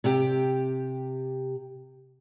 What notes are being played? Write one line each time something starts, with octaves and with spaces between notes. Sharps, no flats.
C3 G4 G5